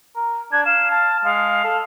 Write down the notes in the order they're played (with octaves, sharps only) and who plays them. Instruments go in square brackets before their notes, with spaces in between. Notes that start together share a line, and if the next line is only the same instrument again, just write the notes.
[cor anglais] A#4
[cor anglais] D4 [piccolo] G#6
[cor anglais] F5 [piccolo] E7
[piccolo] A5
[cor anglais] G#3 [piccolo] F5
[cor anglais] A4